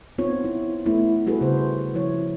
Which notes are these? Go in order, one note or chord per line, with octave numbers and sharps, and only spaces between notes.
B3 C4 D#4 F4 C#5
E4
A3 B3 E4
G3 C4 F#4 G#4 A4 B4
C#3 C5
F3 E4 C#5